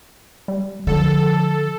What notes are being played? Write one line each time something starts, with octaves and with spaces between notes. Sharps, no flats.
G3
D3 F3 A4